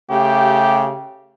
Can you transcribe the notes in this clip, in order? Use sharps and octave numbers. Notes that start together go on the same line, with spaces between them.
C#3 A3 G4